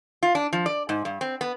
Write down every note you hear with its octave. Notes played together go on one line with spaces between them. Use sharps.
F4
D4
F3
D5
G#2
G2
C4
B3